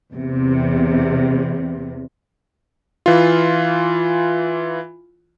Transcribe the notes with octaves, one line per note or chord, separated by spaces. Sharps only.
E2 C3
E3 F4